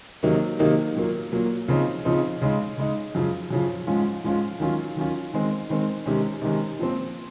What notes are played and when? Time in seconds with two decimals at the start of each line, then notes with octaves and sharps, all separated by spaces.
0.23 C3 D#3 F#3 A#3 D#4
0.59 C3 D#3 F#3 A#3 D#4
0.96 A#2 F#3 A#3
1.32 A#2 F#3 A#3
1.68 C#3 F3 C4 D#4
2.05 C#3 F3 C4 D#4
2.42 C#3 G#3 D#4
2.77 C#3 G#3 D#4
3.15 F#2 C#3 F3
3.51 F#2 C#3 F3
3.87 G#2 F3 G#3 C#4 F4
4.24 G#2 F3 G#3 C#4 F4
4.60 D#3 F#3 C#4 F4
4.96 D#3 F#3 C#4 F4
5.34 D#3 G#3 C4
5.70 D#3 G#3 C4
6.06 C3 D#3 G#3 C#4
6.42 C3 D#3 G#3 C#4
6.79 A#2 F3 C4